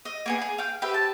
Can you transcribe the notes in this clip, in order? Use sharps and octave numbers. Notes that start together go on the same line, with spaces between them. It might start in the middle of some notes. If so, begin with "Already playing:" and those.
D#5
A#3 B3 G#4
G#4
F5 G5
G4 B4 C5 E5
A5